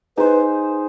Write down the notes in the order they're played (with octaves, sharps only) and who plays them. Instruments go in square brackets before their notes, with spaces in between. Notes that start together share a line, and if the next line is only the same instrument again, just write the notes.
[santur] D#4 G#4 C5 [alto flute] B4